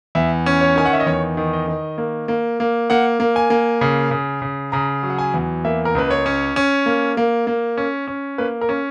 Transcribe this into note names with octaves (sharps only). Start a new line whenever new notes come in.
E2 E5
C#4
C#5
D#3 G#5
F#5
E5
D#5
E2 C#5
D#3
D#5
D#3
A#3
A#3
A#3
A#3 F#5
A#3
G#5
A#3
C#3
C#3
C#3
C#3 A#5
F#3
F#5
G#5
E2
A#3 E5
A#4
C#2 B4
C#5
C#4
C#4
A#3
A#3
A#3
C#4
C#4
A#3 B4
A#4
C#4